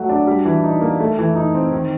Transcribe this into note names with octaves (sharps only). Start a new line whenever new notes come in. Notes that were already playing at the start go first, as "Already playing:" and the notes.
Already playing: F#3 A3 F#4
D4
G3
E3
D#4
A#3
A3
E3
D#4
C4
D#3